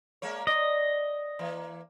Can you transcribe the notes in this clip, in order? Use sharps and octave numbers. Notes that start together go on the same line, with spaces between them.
G#3 A#3 C#5
D5 D#5
E3 A#3